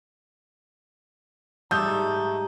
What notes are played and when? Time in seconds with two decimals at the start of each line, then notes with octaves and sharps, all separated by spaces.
1.71 G#2 G3 A3 A#5 D#6 G6